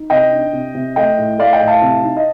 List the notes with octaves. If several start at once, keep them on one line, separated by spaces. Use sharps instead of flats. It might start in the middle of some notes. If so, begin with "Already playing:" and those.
Already playing: D#4
C3 D#5 G5
D4
C3
C3
A3 D#5 G5
A2
A3 D5 F5
D#5 G5
A2
F5 A5
C3
D#4
D#5